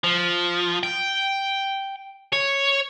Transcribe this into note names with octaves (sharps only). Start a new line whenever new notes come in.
F3
G5
C#5